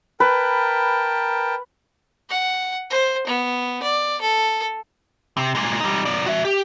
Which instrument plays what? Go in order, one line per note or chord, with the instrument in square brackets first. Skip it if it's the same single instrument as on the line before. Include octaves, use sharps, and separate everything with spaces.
[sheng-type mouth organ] A#4 G5 A5 [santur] B4
[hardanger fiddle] F#5
C5
B3
D5
A4
[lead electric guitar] C3
A#2 G#3
G3 D#4
F#2 D5
F#4 E5
G4